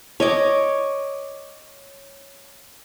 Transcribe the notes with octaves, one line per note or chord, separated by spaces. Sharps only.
C#5 D#5 D6